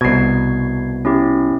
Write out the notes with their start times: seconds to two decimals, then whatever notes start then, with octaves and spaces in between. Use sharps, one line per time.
0.01 C2 B2 G#6 C7
1.05 C#4 E4 G4